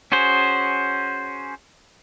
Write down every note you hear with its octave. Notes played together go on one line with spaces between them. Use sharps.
C#4 F#4 G#4 C5